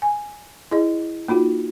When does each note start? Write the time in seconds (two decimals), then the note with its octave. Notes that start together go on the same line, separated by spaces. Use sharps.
0.02 G#5
0.71 E4 G#4 D#5
1.28 A#3 D#4 F4 F#4